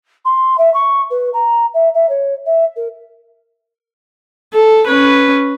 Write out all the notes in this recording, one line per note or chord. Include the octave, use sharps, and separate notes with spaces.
C6
E5
C#6
B4
A#5
E5
E5
C#5
E5
A#4
A4
C#4 B4